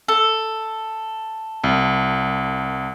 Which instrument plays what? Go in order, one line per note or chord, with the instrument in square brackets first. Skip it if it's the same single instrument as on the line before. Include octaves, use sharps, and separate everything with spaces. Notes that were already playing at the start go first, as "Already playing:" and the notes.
[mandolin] A4
[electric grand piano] C2